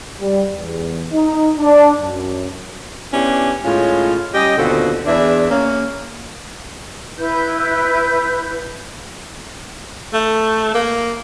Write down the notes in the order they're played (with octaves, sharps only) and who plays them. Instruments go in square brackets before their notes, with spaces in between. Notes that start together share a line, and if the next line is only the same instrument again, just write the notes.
[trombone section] G3
E2
D#4
D4
F#2
[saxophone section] B3 C#4 D4 E4 G4
A2 G#3 C#4 F4
G3 C#4 G4 D#5
D#2 B2 D3 C4 F4 F#4
E2 D4 E5
A#3 C#4
[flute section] E4 B4 G6
[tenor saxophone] A3
A#3